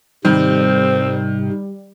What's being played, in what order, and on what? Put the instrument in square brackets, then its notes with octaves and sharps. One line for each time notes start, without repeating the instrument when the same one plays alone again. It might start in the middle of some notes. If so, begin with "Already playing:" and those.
[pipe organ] G#2 C3 [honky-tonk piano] D#3 [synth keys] G3 [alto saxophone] C4